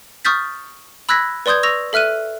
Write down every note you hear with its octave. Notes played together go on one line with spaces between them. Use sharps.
C#6 D#6 F6 G6 A6 B6
B5 E6 F#6 G#6 A#6 B6
B4 D5 C6 D#6 G6 G#6
C#6 E6 A#6 F7
A4 E5 F6 F#6 D#7